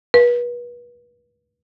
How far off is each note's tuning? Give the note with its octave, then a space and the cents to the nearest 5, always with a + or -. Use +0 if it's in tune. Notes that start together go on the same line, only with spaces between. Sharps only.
B4 -35